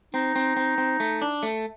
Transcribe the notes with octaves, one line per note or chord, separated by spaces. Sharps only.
C4 D#4
C4
C4
C4
A3
D4
A3